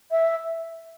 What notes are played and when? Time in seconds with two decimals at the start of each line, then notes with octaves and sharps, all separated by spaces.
0.11 E5